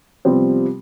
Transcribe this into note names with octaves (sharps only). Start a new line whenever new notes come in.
C3 F3 G3 B3 C4